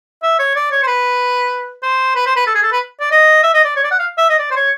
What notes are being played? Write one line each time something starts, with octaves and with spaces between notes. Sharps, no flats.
E5
C#5
D5
C#5
C5
B4
C5
B4
C5
B4
A4
G#4
A4
B4
D5
D#5
E5
D#5
D5
C#5
D5
F#5
F5
E5
D#5
D5
C5
C#5